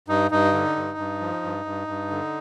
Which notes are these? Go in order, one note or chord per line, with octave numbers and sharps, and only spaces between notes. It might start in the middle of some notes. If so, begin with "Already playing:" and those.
G2 D#4
G2 D#4
D3
G2
G2
F3
G2
G2
G2
D3